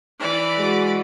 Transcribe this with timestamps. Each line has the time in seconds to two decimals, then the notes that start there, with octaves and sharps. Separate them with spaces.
0.20 E3 D5 B5
0.59 G#3 F#4